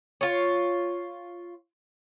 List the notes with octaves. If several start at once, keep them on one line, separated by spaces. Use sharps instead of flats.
F4 C#5